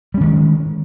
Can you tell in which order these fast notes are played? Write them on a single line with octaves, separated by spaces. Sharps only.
G3 C#4 D#3 G#3